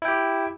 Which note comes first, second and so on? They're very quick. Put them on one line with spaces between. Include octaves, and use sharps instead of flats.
E4 G5 G4